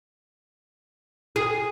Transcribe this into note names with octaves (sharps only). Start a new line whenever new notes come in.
G#4